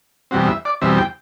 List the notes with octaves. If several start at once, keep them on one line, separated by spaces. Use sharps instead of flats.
E2 B2 G3 C4 F#4
E5
D5
E2 B2 G3 C4 E5
G5